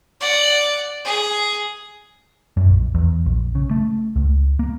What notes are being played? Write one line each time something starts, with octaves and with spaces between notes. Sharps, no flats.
D5 F#5
G#4
F#2
A#1
E2
A#1
C#3
A3
C#2
A#3